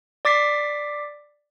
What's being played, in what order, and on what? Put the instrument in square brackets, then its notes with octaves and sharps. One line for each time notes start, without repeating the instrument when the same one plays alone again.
[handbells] D5 D6 A6 B6 C7